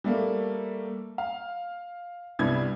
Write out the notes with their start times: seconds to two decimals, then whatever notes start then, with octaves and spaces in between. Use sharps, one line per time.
0.04 G3 A3 A#3
1.18 F5
2.39 C2 G2 G3 B3 E4 G#6